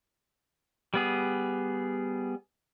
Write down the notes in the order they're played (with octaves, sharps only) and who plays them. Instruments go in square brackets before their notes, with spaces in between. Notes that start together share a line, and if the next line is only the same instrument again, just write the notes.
[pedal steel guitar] G3 B3 G#4